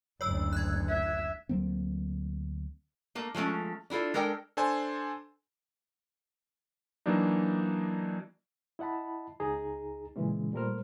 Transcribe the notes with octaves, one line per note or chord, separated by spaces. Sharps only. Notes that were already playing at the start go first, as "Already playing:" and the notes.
F#1 D2 C#5 E6
F#6 G#6
E5
D2 F#3 A#3 C4
A3 A#3
F3 G#3 A3 C#4
D4 E4 F4 A4
G#3 D4 A4 A#4 G5
D4 A4 C5 G#5 C6
E3 F#3 A#3 D4 D#4
E4 D#5 F#5 A5 B5
C#2 D#4 G#4 A#5
A#2 C#3 E3 G#3 C#4
A#2 G3 A3 A#4 C5 F6